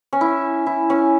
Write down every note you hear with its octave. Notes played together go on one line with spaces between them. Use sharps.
C#4
E4
E4
C#4